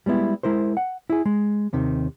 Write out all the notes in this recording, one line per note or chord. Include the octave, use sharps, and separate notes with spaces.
G3 G#3 B3 E4
G#3 E4 A#4 C5
F#5
E4 G#4
G#3
D#2 C3 D#3